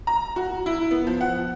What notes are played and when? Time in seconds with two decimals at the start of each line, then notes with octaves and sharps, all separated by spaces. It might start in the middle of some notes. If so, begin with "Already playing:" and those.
0.07 A#5
0.36 F#4
0.66 E4
0.91 B3
1.07 F3
1.21 F#5